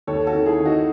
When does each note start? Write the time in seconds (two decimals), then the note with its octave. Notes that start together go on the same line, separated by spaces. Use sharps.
0.07 D#2 A4 C#5
0.27 F#4 A4
0.34 D#3
0.46 E4 G#4
0.59 D#3
0.65 D#4 F#4